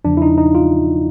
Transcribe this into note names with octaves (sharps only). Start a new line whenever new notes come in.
E2 C#3 F3 D4
E4
D#4
D#4
F4